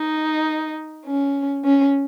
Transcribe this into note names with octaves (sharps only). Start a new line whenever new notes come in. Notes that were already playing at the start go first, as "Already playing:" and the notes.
Already playing: D#4
C#4
C#4